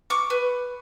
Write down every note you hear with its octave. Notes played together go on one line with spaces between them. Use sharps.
C#6 D6
B4